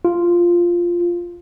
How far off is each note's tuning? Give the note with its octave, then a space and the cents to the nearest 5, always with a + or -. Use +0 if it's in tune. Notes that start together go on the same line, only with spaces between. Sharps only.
F4 -5